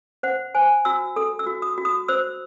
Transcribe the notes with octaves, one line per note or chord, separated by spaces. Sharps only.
C5 F#5
C5 G#5
F#4 E6
A4 D#6
E6
F#4
D#6
F#4
D#6
C5 E6